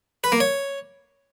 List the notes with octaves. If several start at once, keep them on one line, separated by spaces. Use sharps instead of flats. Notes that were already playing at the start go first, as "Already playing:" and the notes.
B4
A#3
C#5